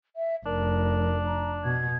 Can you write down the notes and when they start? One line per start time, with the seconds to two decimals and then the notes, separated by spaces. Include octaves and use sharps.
0.16 E5
0.46 F1 D4 A#4
1.26 A#5
1.65 B2 G#6